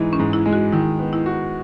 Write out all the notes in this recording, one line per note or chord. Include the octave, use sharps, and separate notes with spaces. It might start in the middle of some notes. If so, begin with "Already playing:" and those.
Already playing: G#2 E3 G#3 D#4
C#4
G#2
E4
G#3
F#4
D#3 E4
B3
E4
F#4